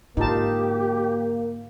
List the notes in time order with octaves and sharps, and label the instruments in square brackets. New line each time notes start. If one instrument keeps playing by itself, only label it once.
[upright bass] G#2 D3 [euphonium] A#3 [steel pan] D#4 F4 A5 [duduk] G4